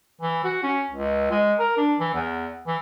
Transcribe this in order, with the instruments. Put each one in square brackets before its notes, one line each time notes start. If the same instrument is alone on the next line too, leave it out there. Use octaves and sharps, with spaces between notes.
[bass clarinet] E3
F#4
C#4
C#2
G#3
A#4
D4
E3
E2
E3